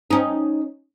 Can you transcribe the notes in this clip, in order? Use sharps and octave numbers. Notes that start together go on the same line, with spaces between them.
C#4 D#4